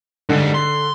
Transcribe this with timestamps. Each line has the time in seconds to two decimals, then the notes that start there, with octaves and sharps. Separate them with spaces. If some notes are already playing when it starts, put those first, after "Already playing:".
0.29 G#2 D3 G3
0.54 C6